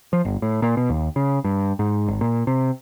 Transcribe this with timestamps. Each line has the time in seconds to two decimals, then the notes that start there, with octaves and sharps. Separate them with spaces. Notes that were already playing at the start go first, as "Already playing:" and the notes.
0.13 F3
0.25 G1
0.42 A2
0.62 A#2
0.77 B2
0.90 D#2
1.16 C#3
1.44 G2
1.79 G#2
2.08 G#1
2.21 A#2
2.47 C3